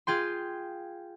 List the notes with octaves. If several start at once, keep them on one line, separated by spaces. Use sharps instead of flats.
F4 G#4 G5 C6